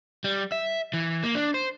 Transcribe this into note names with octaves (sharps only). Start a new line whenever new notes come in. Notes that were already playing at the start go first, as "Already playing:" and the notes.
G3
E5
E3
A#3
D4
C5